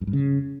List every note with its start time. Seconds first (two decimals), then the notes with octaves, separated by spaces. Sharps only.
0.01 F#2
0.07 G2
0.13 C#3